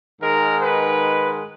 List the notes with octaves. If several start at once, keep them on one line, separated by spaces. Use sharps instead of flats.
G#2 D#3 G#3 A#4
B4